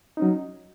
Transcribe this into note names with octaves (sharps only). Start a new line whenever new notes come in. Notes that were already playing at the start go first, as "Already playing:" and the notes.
F#3 C#4 D#4